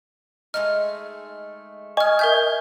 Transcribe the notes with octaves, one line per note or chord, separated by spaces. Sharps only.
G#3 A3 D#4 F6
D#5 G#5 C#6 F6
A#4 E5 G6